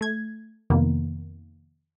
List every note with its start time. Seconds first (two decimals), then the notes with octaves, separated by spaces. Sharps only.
0.01 A3 G#6
0.70 F2 C3 D#3 A#3 B3